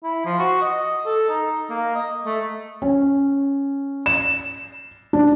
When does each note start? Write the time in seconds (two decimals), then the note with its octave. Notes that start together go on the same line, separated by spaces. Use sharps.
0.03 E4
0.25 F3
0.39 F#4
0.61 D#5
1.06 A4
1.29 D#4
1.70 A#3
1.95 D#5
2.26 A3
2.82 C#4
4.06 E7
5.13 D4